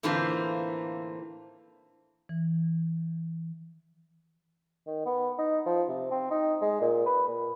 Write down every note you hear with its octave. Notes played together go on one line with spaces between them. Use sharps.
A2 D3 E3 A#3 C4 F4
E3
D#3
B3
D#4
F3
C3
C4
D#4
G#3
A#2
B4
A#2